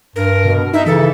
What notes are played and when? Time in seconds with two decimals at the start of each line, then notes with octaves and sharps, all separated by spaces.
0.16 G2 A#4
0.45 B2
0.74 D#4 E5
0.86 C#3 E3 A4